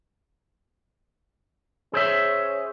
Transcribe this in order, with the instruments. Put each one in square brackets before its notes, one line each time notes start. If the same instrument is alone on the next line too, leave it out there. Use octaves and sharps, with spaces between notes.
[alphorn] C#4 [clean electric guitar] G#4 C5 E5